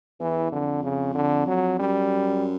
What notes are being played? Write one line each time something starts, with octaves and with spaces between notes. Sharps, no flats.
E2 E3
F2 D3
C#3
D3
F#3
F#2 G3